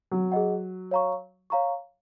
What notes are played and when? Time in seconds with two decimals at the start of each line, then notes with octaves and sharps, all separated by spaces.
0.12 F#3
0.32 G#4 D#5 F#5
0.91 C#5 F5 A#5 C#6
1.50 C#5 F5 A#5 C#6